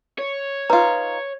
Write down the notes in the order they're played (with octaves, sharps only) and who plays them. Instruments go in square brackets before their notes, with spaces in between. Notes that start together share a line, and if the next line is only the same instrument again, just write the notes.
[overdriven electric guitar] C#5
[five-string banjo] D#4 F4 [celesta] B4 A#5